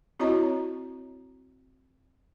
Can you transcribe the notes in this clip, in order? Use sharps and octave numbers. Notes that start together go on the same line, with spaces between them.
C4 E4 F#4 C#5 D#5 A#5